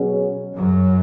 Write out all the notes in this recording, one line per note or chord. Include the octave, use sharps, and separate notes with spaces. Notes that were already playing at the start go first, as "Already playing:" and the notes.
Already playing: B2 F#3 C#4 G#4
F#2 F#3